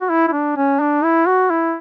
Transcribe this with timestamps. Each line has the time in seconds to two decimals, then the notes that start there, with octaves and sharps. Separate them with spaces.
0.01 F#4
0.10 E4
0.28 E4
0.32 D4
0.57 C#4
0.80 D4
1.04 E4
1.27 F#4
1.50 E4